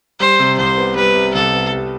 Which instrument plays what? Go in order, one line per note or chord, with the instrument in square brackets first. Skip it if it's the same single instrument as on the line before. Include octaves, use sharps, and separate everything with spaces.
[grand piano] G3 [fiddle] C5
[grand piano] C3
[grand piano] C2 [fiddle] C5
[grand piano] B3
[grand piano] G3 [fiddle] B4
[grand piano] C3
[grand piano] C2 [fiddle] A4
[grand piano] B3
G3